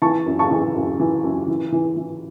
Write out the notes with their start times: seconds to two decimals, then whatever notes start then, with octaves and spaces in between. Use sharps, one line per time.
0.02 E3 A5 C#6
0.26 F#2
0.39 A5 C#6
0.51 E3
0.76 F#2
1.00 E3
1.24 F#2
1.48 E3
1.72 E3
1.97 E3